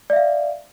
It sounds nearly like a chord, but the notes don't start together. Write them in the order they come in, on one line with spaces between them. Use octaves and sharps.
D5 E5 F5